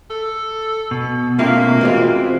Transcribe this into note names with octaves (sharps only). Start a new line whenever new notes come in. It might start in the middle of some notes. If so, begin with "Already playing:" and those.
A4
B2
C3 A3 A#3 C#4 E4 F4
E3 G#3 C4 F4 F#4 C5